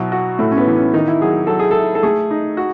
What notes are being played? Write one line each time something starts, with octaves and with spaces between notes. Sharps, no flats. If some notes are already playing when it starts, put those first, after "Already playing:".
Already playing: B2 F#3 E4
F#4
A2 A3
C#4
B3
E3
C#4
D#3 D#4
E4
F#3 G#4
F#3 A4
G#4
A4
E4
A4
A3 G#4
D#4
F#4